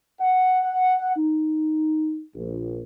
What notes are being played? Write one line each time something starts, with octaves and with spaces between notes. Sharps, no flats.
F#5
D#4
A#1